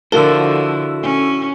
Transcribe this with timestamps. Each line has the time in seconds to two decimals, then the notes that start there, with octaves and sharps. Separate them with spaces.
0.12 D3 F3 E4 F#4 A4 A#4 E6 G7
1.03 C#4